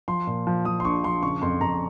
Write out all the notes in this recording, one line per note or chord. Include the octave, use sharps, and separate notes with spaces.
F3 C6
A#2
F3
F3 D#6
C6
A#1 C#6
F3 C6
C#3 C#6
F2 C6
F2 A#5